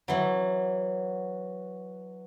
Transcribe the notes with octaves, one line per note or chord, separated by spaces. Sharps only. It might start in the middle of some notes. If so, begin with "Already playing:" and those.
E3 F#3